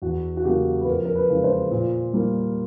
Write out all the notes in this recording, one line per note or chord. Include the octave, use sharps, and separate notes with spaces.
E2 F#4
F#4
C#3 F#3 A#3 G4
B4
F2 A#4
A#4
B4
C#3 E3 G#3
C5
A#2
G3 A#3